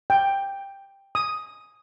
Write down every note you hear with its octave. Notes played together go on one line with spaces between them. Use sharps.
G5
D#6